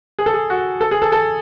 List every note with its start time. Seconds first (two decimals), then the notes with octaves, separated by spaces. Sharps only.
0.19 G#4
0.26 A4
0.34 G#4
0.50 F#4
0.81 A4
0.91 G#4
1.02 A4
1.12 A4